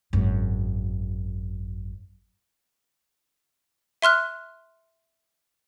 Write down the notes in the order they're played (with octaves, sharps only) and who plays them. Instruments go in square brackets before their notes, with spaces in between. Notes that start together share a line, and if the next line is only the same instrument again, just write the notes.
[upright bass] G#1 F#2
[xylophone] E5 C6 F6 F#6